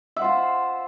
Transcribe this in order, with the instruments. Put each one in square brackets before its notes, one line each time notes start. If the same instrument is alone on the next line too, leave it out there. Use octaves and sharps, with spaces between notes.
[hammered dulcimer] E5
F#5
C5
F4